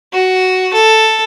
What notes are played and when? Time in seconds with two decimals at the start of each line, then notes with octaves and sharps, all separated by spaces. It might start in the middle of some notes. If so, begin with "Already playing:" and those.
0.13 F#4
0.74 A4